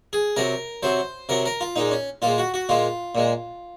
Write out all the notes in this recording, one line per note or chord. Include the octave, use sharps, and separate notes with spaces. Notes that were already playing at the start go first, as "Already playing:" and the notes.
G#4
C3 F#3 A#4
C3 F#3 C5
C3 F#3 A#4
A#4
F4
A#2 G#3 D#4
C#4
A#2 G#3 F4
F#4
F#4
A#2 G#3 F4
A#2 G#3